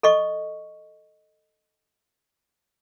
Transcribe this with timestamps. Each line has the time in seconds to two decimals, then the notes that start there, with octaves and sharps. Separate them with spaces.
0.03 A4 D#5 C#6